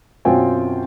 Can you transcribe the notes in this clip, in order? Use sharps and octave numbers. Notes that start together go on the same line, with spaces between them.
F#2 B2 C4 F4 G5 G#5